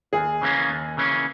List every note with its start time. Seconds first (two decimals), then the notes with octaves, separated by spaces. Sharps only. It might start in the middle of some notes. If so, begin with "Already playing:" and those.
0.13 D#2 G#4
0.42 C#3 E3 A#3 C#4
0.70 D#2
0.97 C#3 E3 A#3 C#4